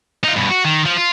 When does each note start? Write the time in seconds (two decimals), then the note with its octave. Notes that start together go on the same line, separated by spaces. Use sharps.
0.24 D#4 F4
0.36 G2 B2
0.50 F#4
0.65 D#3
0.85 F3
0.97 F4